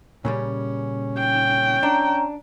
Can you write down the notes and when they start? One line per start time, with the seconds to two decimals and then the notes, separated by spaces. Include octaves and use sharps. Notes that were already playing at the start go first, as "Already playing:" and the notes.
0.25 A#2 C#3 G3 C#4
1.19 G5
1.83 D4 A#5